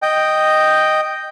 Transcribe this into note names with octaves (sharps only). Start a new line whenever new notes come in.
D#5 G5